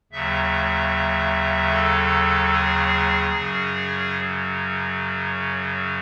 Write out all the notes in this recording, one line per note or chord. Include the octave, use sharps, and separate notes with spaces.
D#2 C#3 F#3 E5
A4
G#4
F#2 C#3 F#3